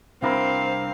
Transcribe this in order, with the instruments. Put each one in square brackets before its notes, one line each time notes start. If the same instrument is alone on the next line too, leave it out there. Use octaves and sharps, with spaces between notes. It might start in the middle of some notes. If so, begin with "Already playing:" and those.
[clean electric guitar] C2 D4 B5 [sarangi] C4 [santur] E4 A#4 [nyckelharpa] F5